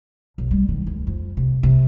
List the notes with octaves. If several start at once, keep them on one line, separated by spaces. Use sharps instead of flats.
B1
G3
D#3
D2
F2
C3
C3